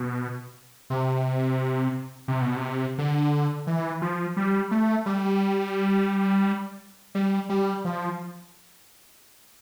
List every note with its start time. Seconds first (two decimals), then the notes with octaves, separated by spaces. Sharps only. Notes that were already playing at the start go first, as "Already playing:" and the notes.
Already playing: B2
0.90 C3
2.28 C3
2.42 B2
2.56 C3
2.98 D3
3.67 E3
4.02 F3
4.37 G3
4.71 A3
5.06 G3
7.15 G3
7.49 G3
7.85 F3